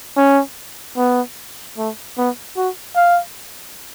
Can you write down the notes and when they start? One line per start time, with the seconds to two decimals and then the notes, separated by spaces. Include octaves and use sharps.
0.17 C#4
0.97 B3
1.78 A3
2.18 B3
2.57 F#4
2.96 F5